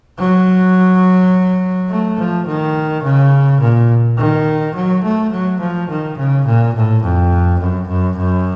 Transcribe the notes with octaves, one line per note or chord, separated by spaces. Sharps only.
F#3
A3
F3
D#3
C#3
A#2
D#3
F#3
A3
F#3
F3
D#3
C#3
A#2
A2
F2
F#2
F#2
F#2